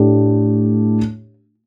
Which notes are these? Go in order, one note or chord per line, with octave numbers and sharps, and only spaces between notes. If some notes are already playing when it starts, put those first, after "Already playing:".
Already playing: A2 A3 D4 G4